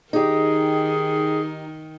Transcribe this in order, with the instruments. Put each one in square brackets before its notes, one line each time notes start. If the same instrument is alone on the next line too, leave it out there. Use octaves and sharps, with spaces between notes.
[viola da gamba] D#3 [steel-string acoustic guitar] D#4 G4 [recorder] G#4